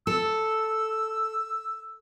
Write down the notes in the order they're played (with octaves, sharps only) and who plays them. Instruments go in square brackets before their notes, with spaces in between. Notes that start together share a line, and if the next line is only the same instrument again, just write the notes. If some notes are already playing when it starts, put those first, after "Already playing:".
[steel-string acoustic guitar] A4 [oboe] E6